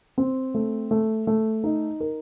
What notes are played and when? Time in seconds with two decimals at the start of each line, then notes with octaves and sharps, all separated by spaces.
0.18 C4
0.54 A3
0.91 A3
1.27 A3
1.64 D#4
2.00 A#4